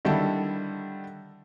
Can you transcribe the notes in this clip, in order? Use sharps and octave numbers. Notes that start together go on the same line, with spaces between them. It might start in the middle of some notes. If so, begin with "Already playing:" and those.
D3 D#3 G3 E4 A4